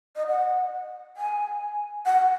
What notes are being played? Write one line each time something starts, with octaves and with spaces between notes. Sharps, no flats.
D#5
F#5
G#5
F#5